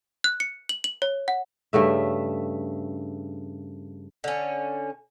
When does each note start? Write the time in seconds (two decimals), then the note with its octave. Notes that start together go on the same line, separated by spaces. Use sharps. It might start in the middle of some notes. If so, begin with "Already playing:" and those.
0.24 F#6
0.40 C#7
0.69 F#7
0.84 F#7
1.02 C#5
1.28 F#5
1.73 G2 C#3 A3 E5
4.24 D3 C#4